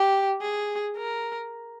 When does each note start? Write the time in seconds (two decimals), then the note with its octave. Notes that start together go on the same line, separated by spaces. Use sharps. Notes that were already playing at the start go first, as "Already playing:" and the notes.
Already playing: G4
0.42 G#4
0.97 A#4